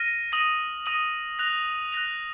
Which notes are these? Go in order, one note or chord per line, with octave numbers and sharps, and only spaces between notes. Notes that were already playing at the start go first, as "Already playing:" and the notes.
Already playing: F6 A#6 D#7
D#6 A#6 D#7 F#7
D#6 A#6 D#7 F#7
F#6 A#6 F7
F#6 A#6 F7